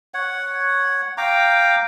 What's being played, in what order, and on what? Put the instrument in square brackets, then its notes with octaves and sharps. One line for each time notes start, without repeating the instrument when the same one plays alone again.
[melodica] C#5 F#5
F5 G5 A#5 D6